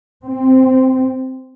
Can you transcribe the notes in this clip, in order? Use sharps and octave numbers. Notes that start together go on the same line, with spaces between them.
C4